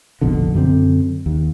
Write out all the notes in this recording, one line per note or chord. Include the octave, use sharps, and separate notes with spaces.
F1 A#1 B2 D3
F#2 D3 C4
D#2